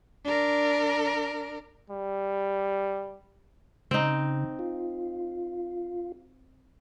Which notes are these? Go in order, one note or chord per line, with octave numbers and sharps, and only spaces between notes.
D4 A#4
G3
C#3 C4 D#4
F4